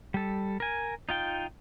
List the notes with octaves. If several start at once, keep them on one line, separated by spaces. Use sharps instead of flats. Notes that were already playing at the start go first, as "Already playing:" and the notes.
G3 A4
A#4 G#5
D#4 F4 G5